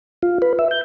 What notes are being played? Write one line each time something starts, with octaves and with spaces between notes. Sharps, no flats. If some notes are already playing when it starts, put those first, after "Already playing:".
F4
B4
E5
G6